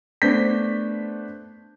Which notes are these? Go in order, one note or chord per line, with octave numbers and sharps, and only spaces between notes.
A3 B3 D4 C5 G6 B6